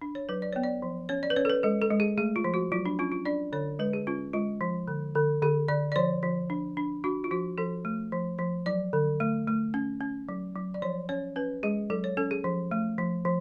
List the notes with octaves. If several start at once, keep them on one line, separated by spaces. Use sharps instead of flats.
D4
C#5
F#3 B4
D5
B3 C#5
D5
F3
C#4 C#5
D5
B4
C#4 C#5
A4
B4
G#3 A4
A4
G#3
G#4
A3 G#4
F4
F3
F#4
F#3 F4
D4
C#4 F4
F4
D4 D5
D3 C#5
G#3 B4
G#4
C#4 F4
G#3 F4
F3
D3
D3
D3 G#4
D3 D5
D5
F3 C#5
F3
D4
D4
D4 F#4
F4
F3 F#4
F3 A4
A3
F3
F3
F#3 D5
D3
A3
A3
C#4
C#4
F#3
F#3
D5
F3 C#5
C#4 C#5
C#4 B4
G#3 G#4
F#3 A4
C#5
C#4 A4
G#4
F3
A3
F3
F3